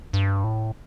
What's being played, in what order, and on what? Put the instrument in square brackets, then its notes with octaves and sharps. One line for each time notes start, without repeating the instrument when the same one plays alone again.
[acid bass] G2
A2